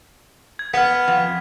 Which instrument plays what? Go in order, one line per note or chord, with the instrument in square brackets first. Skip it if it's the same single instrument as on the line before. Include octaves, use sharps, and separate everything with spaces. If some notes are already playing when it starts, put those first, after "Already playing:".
[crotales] G#6
[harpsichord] B3 [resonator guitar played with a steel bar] F#5 [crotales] F6 B6
[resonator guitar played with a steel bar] F2